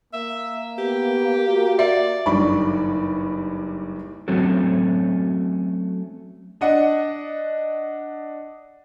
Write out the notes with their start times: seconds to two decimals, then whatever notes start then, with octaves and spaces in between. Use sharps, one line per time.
0.13 A#3 E5
0.78 B3 G4
1.47 F#4
1.79 D5 E5
2.26 F#1 G2 D#3 D5 B5 C#6
4.28 F#3 A3 C4 C#4 F#4 A4
6.61 D4 D#5 F#5